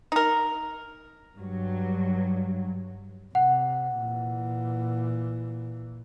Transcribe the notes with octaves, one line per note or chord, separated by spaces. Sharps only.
D#4 A#4
G2 F#3
C3 F#5
A#2 E3